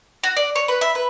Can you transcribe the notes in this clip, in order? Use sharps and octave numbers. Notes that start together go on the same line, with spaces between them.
F#4
D5
C#5
B4
E5
B4